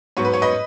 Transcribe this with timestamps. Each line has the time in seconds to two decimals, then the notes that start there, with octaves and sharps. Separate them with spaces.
0.17 G#2 F#3 B3 C#5
0.25 B4
0.33 C#5
0.42 B4 D#5